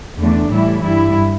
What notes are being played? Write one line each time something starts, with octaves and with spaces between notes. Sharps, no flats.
E2 D3 A3 D4
A2 E3 G3 E4
G2 G3 E4